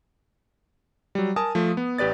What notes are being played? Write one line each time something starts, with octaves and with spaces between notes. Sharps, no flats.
F#3 G3
A#4 G#5 A5 D#6
F3 A3
B3
A1 G4 B4 D5 A6